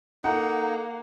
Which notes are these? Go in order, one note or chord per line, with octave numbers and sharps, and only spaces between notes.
A#3 D#4 A4 F#5